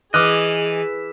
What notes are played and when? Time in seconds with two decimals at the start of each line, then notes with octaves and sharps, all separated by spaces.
0.14 E3 G#4 D#5 D6 F6 F#6